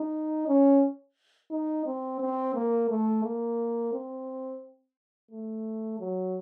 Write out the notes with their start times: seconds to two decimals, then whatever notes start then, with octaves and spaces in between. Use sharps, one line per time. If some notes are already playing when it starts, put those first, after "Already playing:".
Already playing: D#4
0.48 C#4
1.51 D#4
1.86 C4
2.21 C4
2.55 A#3
2.90 A3
3.24 A#3
3.93 C4
5.31 A3
6.00 F#3